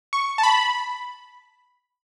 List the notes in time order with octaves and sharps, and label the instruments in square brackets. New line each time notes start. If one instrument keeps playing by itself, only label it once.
[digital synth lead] C#6
A5
B5